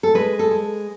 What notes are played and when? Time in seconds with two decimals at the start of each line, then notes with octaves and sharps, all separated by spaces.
0.03 A4
0.15 G#3 B4
0.39 A4
0.51 G#3